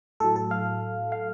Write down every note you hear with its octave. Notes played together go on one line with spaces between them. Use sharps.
A2 F#3 A4
A4
F5
F5